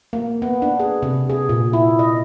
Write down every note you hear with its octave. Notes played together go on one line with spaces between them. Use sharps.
A#3
B3
D4
G#4
C3
G#4
A#2
E4
D#5